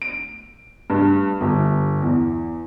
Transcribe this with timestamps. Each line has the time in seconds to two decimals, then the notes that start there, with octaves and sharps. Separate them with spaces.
0.02 D7
0.90 G2
1.41 G1
2.02 E2